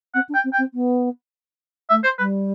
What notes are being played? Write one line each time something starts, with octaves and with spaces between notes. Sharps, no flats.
C4 F#5
D4
G5
C4
G5
C4
B3
A3 E5
C5
G3 B4